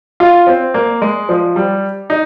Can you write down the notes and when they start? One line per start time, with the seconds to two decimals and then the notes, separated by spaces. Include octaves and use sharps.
0.20 F4
0.47 C4
0.74 A#3
1.02 G#3
1.29 F3
1.56 G3
2.10 D#4